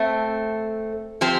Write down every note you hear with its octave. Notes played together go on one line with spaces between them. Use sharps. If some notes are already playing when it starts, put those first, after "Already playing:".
Already playing: A3 C4 A4
F3 C4 G4 C5